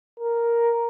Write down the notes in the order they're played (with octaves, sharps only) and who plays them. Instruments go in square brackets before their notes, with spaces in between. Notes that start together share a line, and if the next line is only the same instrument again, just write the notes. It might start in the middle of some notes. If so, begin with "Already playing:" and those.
[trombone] A#4